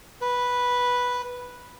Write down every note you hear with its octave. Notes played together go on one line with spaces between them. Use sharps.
B4